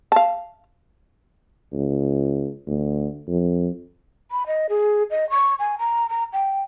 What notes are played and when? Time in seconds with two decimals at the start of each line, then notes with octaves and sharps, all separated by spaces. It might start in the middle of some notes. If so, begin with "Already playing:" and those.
0.12 F5 A5
1.73 C#2
2.67 D2
3.28 F2
4.31 B5
4.47 D#5
4.69 G#4
5.10 D#5
5.30 C#6
5.59 G#5
5.79 A#5
6.09 A#5
6.33 G5